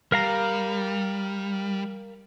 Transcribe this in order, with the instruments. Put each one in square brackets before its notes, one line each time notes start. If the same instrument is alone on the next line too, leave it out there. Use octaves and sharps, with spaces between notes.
[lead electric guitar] G3 [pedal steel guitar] A#4 F5 A#5